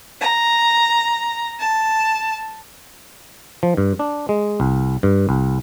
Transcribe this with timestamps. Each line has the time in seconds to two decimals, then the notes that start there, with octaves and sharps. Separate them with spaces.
0.20 A#5
1.58 A5
3.63 F3
3.77 G2
3.99 D4
4.29 G#3
4.60 C2
5.03 G2
5.29 C2